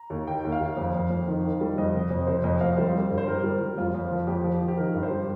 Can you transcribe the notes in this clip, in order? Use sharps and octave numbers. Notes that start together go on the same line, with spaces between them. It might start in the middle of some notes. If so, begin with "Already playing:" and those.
Already playing: A#5
D#2
D#3 G5
D#2
F5
D#2
F2
F2
F2
D#3
D#3
G3
F2 D#5
C3
F2
C3 C5
F2 D#5
F2 F5
G3 C5
G3
G2
C5
G3 A#4
G3
G3
F2 F4
F2
F3
F2 G4
F3
F3
G4
D#3 A#4
G2
C5
G3